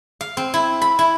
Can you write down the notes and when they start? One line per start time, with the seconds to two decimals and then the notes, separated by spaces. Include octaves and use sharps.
0.21 F5
0.37 C4
0.54 E4
0.82 B5
0.99 E4